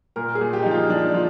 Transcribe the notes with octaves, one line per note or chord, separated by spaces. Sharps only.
A#2 A#4
G#4
A#2
G4
F3 D#4
F4
F3 D4
F3 F4